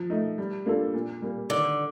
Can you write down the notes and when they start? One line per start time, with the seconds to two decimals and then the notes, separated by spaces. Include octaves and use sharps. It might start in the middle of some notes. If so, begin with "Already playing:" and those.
Already playing: F3
0.10 A3 D#4
0.38 G3
0.66 A#3 D4 F4 A4
0.94 A#2
1.22 G3 A#3
1.50 D3 D#3